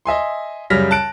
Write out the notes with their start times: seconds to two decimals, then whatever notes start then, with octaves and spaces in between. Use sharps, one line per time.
0.05 D#5 E5 G#5 C6
0.70 F#2 C#3 G3 F6 A#6 B6
0.91 A5 F#6 D7